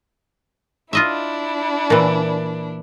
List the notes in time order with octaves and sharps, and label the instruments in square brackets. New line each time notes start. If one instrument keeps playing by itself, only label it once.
[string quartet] D4 E4 [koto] F4 D#5 E5
[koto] A#2 E3